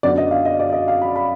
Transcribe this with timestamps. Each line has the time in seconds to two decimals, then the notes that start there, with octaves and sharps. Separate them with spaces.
0.03 F#2 D3 F#3 B3 D5
0.17 D#5
0.31 F5
0.45 D#5
0.60 D5
0.73 D#5
0.88 F5
1.02 B5
1.16 B5